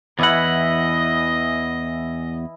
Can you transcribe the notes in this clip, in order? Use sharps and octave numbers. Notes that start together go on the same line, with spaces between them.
E2 E3 E4 D#5 F#5 B5